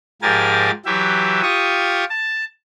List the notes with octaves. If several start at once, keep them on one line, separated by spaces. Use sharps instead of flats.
G#2 F3 G4 A#4 G#5 A6
E3 F#3 G4 E5
F4 G4 C#6 D#6
A5